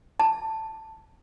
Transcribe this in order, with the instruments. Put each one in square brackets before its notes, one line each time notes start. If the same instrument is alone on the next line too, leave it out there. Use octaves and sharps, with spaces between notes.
[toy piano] A5